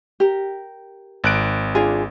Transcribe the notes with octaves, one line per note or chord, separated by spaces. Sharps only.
G4 A#4
G#1 F#6 D7
D4 F4 G#4